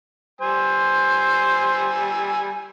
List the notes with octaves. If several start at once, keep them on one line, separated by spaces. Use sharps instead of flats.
G3 C5 G#5 E6